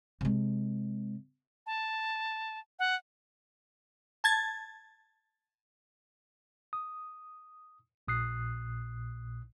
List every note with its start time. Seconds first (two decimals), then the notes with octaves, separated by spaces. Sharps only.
0.21 C3 G#3
1.66 A5
2.79 F#5
4.24 A5 G#6 A6
6.73 D#6
8.08 A#1 A#2 D#6 F#6 C7